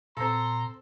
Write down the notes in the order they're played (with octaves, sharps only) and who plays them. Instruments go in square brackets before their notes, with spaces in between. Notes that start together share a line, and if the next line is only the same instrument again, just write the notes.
[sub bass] A#2 [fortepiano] C4 A4 [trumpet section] A#5 C6